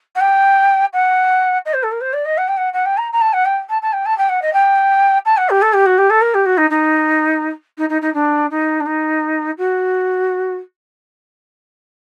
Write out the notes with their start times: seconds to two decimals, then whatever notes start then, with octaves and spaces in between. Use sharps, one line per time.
0.15 F#5
0.20 G5
0.93 F#5
1.65 D#5
1.73 C5
1.83 A4
1.91 A#4
2.01 C5
2.13 D5
2.25 D#5
2.37 F#5
2.48 G5
2.57 F#5
2.73 F#5
2.85 G5
2.97 A#5
3.12 A#5
3.21 A5
3.33 F#5
3.45 G5
3.69 A5
3.82 A5
3.93 G5
4.05 A5
4.18 G5
4.29 F#5
4.42 D#5
4.53 G5
5.25 A5
5.37 F#5
5.49 G4
5.62 A4
5.73 G4
5.86 F#4
5.98 G4
6.10 A4
6.21 A#4
6.34 G4
6.45 F#4
6.57 D#4
6.70 D#4
7.78 D#4
7.89 D#4
8.01 D#4
8.14 D4
8.50 D#4
8.80 D4
8.86 D#4
9.57 F#4